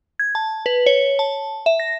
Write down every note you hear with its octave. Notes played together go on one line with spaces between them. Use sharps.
G#6
A5
B4
C#5
A5
E5
A#6